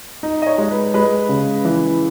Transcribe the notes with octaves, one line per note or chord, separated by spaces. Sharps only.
D#4
D#5
C#5
G#3
B4
G#3 B4
C#3
E3